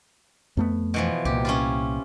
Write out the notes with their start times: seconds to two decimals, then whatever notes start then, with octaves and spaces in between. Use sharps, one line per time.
0.57 F2 A3 B3
0.94 B2 E3 F3
1.25 C2 A#2 G4
1.45 C#4 E4 F4